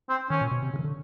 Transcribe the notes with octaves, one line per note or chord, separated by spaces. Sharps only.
C4
D#3 C#4
A#2
B2
C3
C#3
D#3
D3